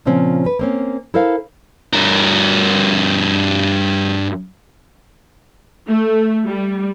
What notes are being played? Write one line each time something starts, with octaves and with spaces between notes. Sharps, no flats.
A#2 C#3 F3 C4 C#4
B4
A#3 C4 C#4
E4 A4 A#4 C5 F5
G2 A#4
A3
G3